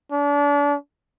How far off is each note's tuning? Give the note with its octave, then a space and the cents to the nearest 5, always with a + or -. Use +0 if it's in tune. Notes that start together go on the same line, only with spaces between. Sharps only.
D4 -35